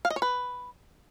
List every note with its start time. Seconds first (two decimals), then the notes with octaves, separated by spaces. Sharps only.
0.05 F5
0.10 D#5
0.16 C#5
0.22 B4